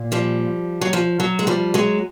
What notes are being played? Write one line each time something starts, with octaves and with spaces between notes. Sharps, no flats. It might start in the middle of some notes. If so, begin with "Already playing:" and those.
Already playing: A#2
F3 G3
F#3
F3
F#3
G#3
F3 G3
F#3 G#3